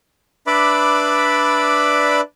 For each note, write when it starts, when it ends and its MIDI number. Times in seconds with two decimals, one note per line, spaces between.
0.47 2.21 62
0.47 2.21 71
0.47 2.21 74
0.47 2.21 76
0.47 2.21 83
0.47 2.21 86